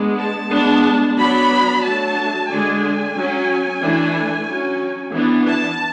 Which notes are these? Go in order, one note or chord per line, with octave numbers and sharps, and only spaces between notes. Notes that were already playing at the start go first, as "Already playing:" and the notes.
Already playing: G#3 B3 D4
A5
G#3 B3 D4
F#3 B3 D4 B5
F#3 A3 D4 A5
D3 G#3 D4 G#5
F#3 C#4
E3 A3 D4
F#3 C#4
E3 B3 D4
A5